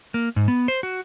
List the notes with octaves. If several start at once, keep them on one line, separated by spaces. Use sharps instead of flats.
A#3
G#2
B3
C5
F#4